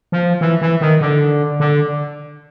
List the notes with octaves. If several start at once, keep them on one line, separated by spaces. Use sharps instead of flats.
F3
E3
E3
D#3
D3
D3